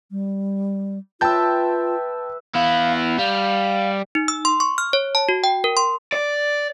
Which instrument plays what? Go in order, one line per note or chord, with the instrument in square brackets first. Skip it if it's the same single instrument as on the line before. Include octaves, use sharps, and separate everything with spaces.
[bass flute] G3
[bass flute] F4 [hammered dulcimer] B4 E5 [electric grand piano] G5 A5 G6
[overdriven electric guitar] B3 E4 [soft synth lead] F5
[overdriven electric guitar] G3 [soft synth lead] F5
[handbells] D#4
E6
C6
C#6
F6
C#5
A5
F#4
G5
A#4
C6
[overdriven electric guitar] D5